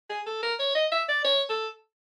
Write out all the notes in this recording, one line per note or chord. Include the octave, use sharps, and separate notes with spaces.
G#4
A4
A#4
C#5
D#5
E5
D5
C#5
A4